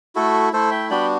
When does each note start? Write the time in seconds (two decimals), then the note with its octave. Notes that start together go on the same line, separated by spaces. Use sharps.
0.15 A3 E4 F#4 A4
0.53 A3 E4 A4 C5
0.71 E5 G5
0.90 G3 B3 D4 F#4 G5 B5